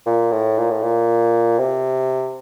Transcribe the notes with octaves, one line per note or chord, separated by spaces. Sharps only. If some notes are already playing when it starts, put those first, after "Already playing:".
A#2
A2
A#2
A2
A#2
C3